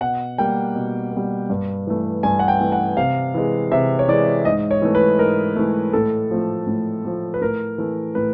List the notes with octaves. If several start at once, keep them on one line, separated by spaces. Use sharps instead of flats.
B2 F#5
G3 A#3 G5
B2
G3 A#3
G2
E3 A3
G2 G#5
F#5
G5
E3 A3
F#5
C3 F5
E3 G#3
C3 E5
C#5
E3 G#3 D5
G#2 D#5
C#5
E3 A3
B4
G#2 A#4
E3 A3
A2 A4
F3 A3
A2
F3 A3
B4
A2 A#4
E3 A3
A2 B4